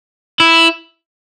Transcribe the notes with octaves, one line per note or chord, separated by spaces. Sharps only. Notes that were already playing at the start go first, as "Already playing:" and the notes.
E4